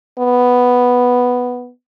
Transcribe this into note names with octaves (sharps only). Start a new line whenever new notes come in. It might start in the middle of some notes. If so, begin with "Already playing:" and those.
B3